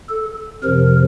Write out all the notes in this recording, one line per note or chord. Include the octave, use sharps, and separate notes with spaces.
A4
F2 C3 F3 A#4